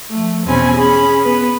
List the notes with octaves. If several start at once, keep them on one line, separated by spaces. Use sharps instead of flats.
F3 A3
E2 B2 C4 C#4 G#5 B5
C#4 G#4 B5
B3 B4